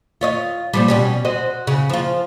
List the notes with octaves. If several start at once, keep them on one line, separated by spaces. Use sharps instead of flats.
F4 C#5 D#5
A#2 F3 G3
B2 G3 C#4
F#4 C5 D#5
C#3
F3 F4